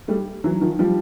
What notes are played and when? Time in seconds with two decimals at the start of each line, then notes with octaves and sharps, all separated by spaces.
0.08 G3 A3
0.44 E3 F#3
0.61 D#3 F3
0.79 F3 G3